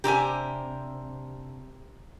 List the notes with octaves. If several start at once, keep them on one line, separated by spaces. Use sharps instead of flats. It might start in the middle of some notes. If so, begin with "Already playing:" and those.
C3 D4 G4 A#4 C5 E5 G#5